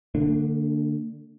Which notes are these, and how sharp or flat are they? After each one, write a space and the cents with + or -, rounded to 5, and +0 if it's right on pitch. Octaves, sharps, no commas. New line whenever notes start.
D3 +0 A#3 -45 D4 +10